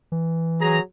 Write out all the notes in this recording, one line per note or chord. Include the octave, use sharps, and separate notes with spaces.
E3
F#3 G#4 A#5